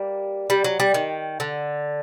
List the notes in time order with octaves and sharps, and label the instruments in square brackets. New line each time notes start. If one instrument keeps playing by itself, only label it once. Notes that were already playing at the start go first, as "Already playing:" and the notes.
Already playing: [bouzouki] G3 A#3
G3
F#3
G3
D#3
D3